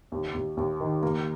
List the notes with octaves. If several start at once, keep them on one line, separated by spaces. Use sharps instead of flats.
D#2
D#2
D#2
D#3
A#3